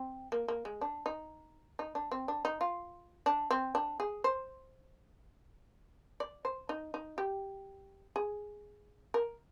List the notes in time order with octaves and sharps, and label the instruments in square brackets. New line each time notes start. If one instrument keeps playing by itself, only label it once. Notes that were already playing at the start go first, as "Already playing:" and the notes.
Already playing: [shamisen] C4
A#3
A#3
G#3
D4
D#4
D#4
D4
C4
D4
D#4
F4
D4
C4
D4
G#4
C5
D5
C5
D#4
D#4
G4
G#4
A#4